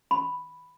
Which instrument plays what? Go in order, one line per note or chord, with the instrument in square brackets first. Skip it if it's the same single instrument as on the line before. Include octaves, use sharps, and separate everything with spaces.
[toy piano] B5